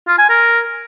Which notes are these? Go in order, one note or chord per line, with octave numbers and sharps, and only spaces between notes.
F4
G#5
A#4